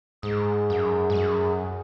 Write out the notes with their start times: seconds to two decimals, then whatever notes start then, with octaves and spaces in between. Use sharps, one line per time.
0.23 G#2 G#4
0.70 F#2
1.10 G#2
1.15 F#2